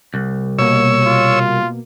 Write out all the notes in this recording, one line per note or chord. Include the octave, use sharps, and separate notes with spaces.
C2
B2 A#3 C#5 E6
F4